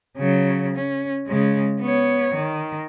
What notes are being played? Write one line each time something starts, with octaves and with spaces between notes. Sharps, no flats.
C#3 F#3
C#4
C#3 G#3
B3 C#5
D#3